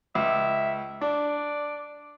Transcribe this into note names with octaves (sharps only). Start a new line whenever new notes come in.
C#2 E5
D4 D5